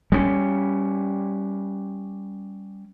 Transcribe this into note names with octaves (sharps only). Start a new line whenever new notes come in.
G3 A3 C#4